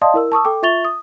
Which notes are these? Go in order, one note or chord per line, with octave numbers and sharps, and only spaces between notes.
D5 D#5 F5 A5 C6 D#6
E4 A#4 E6
A5 C#6 D#6 E6
A4 G5 D6
F4 E5 C#6 A6 F7 G7
D#6